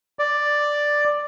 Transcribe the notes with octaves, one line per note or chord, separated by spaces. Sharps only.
D5